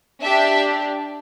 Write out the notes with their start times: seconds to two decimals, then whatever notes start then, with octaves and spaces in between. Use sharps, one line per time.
0.22 D4 G4 E5